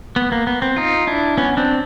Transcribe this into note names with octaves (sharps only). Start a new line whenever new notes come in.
B3
A#3
B3
C4
D#4 F4
D4 E4
B3 C#4
C4 D4